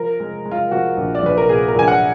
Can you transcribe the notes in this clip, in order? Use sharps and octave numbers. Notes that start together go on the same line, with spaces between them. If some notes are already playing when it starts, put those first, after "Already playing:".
Already playing: F3 A#4
G#3
G#3
F4
F3 F#4
A#1
D5
A#1 B4
A#4
A#2 G#4
A#4
A#1 G#5
F#5